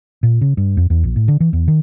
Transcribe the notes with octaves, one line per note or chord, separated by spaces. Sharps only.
A#2
C#3
G2
F2
E2
A#1
A2
D3
E3
E2
D#3